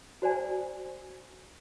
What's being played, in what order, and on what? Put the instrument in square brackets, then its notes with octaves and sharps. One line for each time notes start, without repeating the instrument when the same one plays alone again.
[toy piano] F#4 C5 D5 G#5